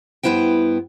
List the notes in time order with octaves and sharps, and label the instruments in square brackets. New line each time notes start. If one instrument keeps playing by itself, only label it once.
[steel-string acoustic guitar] G2 B3 E4 C5 G5